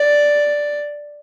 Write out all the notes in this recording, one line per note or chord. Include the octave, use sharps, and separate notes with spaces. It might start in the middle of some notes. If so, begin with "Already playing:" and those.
Already playing: D5